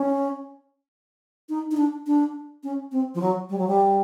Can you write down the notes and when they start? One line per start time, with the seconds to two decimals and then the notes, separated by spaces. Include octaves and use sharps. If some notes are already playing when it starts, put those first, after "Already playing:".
Already playing: C#4
1.49 D#4
1.71 D#4
1.77 D4
2.07 D4
2.64 C#4
2.92 C4
3.15 F3
3.21 F#3
3.50 G3
3.58 F#3
3.68 G3